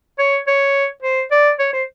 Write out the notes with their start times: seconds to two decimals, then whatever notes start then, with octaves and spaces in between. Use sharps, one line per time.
0.19 C#5
0.47 C#5
1.03 C5
1.31 D5
1.59 C#5
1.73 C5